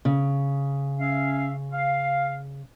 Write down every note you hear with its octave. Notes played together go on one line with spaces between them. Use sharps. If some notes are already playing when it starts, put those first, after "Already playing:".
C#3
C#4 E5 F5
F5